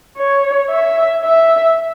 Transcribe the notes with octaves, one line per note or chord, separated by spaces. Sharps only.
C#5
E5
E5